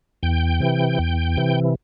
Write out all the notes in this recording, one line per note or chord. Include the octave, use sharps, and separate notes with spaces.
E2 G5
C3 E3
E2
C3 E3